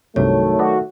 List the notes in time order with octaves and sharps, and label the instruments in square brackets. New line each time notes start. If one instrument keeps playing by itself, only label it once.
[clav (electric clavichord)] C2 G2 C3 [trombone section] D#3 F#3 A3 [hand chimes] C#5
[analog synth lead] F#4 [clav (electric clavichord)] B4 D5 D#5